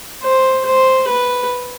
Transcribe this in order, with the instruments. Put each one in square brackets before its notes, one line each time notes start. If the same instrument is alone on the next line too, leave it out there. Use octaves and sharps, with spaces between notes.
[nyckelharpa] C5
C5
B4